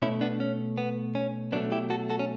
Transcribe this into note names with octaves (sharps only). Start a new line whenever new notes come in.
B2 A3 C#4 E4
B3 D4
C#4
B3
C#4
B2 F#3 A3 B3 D4
E4 G4
F#4 A4
F#4 A4
C#4